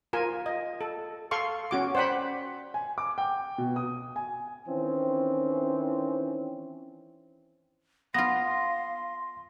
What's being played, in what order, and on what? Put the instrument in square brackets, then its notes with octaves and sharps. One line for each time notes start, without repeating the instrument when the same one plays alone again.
[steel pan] F4 A#4 G#5
D#5
A4
A4 F5 C6 C#6
C#4 F#4 D6
C5 D5 F#5 G5 B5
[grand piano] G#5
D6
G5
B2
D#6
G#5
[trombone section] D#3 E3 C4 C#4
[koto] B3 F4 [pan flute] F5 [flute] C6 [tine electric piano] A#6